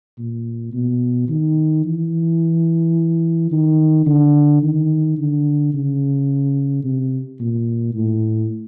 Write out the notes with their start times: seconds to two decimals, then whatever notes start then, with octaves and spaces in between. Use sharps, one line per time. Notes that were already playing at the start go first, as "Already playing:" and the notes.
0.18 A#2
0.73 B2
1.29 D#3
1.85 E3
3.52 D#3
4.06 D3
4.62 D#3
5.18 D3
5.74 C#3
6.84 C3
7.40 A#2
7.94 A2